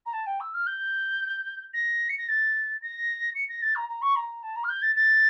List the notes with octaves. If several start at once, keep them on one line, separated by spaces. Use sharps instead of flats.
A#5
A5
G5
E6
F6
G6
A#6
C#7
A#6
A6
A#6
C#7
A#6
A6
A#5
A#5
C#6
A#5
A5
A#5
F6
G6
A6
A6